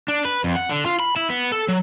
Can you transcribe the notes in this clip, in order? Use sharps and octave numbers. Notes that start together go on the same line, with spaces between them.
D4
B4
F2
F#5
D3
F4
B5
E4
B3
A4
F#3